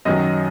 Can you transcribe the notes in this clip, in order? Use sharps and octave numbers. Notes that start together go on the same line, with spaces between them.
F#2 D#3 F#3 D#5